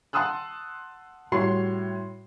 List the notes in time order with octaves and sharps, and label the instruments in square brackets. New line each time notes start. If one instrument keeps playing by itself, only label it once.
[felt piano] F#5 A5 C6 D#6 E6 F#6
A2 G3 F#4 C#5 C6 C7